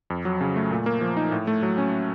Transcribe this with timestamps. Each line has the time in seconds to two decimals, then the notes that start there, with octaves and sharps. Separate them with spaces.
0.10 F2
0.25 F#3
0.41 C#3
0.56 A3
0.71 A#2
0.86 A#3
1.01 F3
1.17 D#4
1.32 A2
1.47 A3
1.63 F#3
1.78 C#4